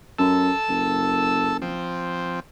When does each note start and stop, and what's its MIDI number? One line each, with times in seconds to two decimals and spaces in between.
0.19 0.51 42
0.19 1.57 69
0.19 1.57 81
0.19 1.57 88
0.69 1.78 30
1.62 2.40 53
1.62 2.40 60